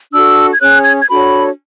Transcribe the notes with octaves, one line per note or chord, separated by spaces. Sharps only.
D4 F#4 A4 E6
G#6
C#4 G#4 C#5 F#6
G#6
G#6
D4 F#4 A4 C#5 B5